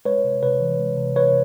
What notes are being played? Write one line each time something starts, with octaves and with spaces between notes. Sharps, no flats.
G#3 B4 C#5
C3
C3 B4 C#5
E3
G#3
C3
C3 B4 C#5